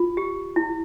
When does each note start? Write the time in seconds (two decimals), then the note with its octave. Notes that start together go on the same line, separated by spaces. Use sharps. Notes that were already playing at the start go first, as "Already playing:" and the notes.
Already playing: F4
0.17 G4
0.56 E4